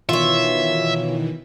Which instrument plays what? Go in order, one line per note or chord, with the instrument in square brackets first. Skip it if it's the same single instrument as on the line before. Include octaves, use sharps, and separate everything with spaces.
[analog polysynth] B2 D#3 E3 [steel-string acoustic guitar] F4 C#5 [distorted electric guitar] E5